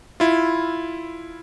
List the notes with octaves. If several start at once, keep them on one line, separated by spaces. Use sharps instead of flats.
E4 F4